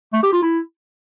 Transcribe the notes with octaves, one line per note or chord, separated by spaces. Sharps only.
A3
G4
F4
E4